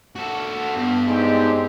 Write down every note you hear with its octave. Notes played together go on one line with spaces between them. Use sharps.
F#4 A4
G2 B3
G#3 C4 D#4 G4